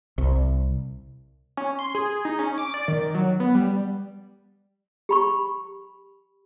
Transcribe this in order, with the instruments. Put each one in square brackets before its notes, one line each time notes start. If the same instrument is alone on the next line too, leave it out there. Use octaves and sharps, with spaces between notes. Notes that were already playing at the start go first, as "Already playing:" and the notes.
[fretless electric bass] C2
[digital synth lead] C#4
C6
G#4
D#4
C#4
D6
D5
D#3
F#3
B3
G3
[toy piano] G4 B5 C#6